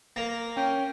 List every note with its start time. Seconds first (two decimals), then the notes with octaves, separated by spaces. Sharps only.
0.16 A#3
0.57 C#4 G5